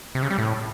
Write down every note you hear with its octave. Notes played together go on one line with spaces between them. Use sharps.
C3
C#3
G3
A2